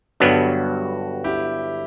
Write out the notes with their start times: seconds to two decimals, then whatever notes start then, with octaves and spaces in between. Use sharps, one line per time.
0.20 G1 G2 F#3 B3 D4 F#4
1.24 E4 G4